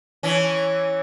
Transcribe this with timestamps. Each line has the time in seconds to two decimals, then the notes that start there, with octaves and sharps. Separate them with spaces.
0.23 E3 C#4